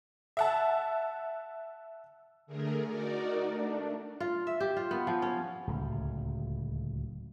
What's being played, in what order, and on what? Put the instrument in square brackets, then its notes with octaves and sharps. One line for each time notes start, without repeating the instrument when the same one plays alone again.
[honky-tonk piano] E5 F#5 A5
[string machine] D3 A3 G#4 A#4
D#4 F#4 A#4 D5
A3 D4
[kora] F4
E5
G4
F4
B3
F3
C#4
[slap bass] D1 C#2